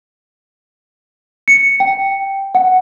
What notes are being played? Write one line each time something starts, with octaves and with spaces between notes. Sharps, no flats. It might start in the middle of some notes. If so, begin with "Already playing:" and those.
C#7
G5
F#5